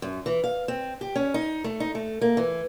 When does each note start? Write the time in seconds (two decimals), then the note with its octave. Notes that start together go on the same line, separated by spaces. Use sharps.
0.02 F#2
0.26 E3
0.44 F5
0.68 C4
1.01 G4
1.16 C#4
1.34 D#4
1.64 A3
1.80 D#4
1.95 A3
2.21 A#3
2.37 E3